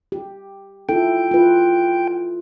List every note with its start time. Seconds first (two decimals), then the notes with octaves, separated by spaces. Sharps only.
0.12 G4
0.89 E4 F4 A4 G5
1.31 F4 B4